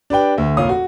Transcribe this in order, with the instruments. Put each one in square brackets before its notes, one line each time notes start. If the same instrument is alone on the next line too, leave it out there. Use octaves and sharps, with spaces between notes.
[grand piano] D4 G4 B4 G5
D2
F1 A#2 C#5 F5 D#6
F#4